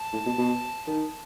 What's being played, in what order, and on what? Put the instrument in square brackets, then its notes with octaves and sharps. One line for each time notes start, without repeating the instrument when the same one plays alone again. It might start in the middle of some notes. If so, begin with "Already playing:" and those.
Already playing: [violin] A5
[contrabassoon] A2
B2
B2
[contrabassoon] D#3 [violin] A5